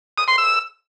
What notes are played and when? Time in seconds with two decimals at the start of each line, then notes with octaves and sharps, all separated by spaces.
0.18 D#6
0.28 C6
0.38 E6